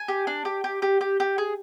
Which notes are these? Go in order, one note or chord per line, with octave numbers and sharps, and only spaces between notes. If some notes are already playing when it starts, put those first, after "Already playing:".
Already playing: G#5
G4
D4
G4
G4
G4
G4
G4
G#4